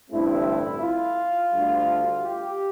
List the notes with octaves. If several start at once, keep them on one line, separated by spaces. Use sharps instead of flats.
A1 G2 D3 A3 C4 E4
F4
D2 D3 G3
G4